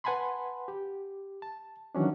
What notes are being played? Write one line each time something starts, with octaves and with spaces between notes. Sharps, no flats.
B4 F#5 G#5 A5 B5 C6
G4
A5
D#3 E3 F#3 C#4 D4